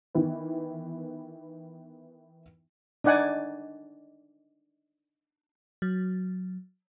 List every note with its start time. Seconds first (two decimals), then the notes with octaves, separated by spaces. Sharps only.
0.15 D#3 E3 B3
3.04 D4 D#4 D5 F#5 G#5
5.82 F#3